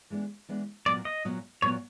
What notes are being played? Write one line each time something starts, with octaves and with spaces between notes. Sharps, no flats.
E3 G#3 B3 D4
E3 G#3 B3 D4
A#2 F#3 B3 D5
D#5
A#2 F#3 B3
A#2 F#3 B3 C#5